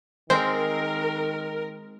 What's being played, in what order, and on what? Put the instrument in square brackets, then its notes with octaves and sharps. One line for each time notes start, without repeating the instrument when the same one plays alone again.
[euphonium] D#3 [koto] G#3 C4 [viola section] A#4 [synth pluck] C5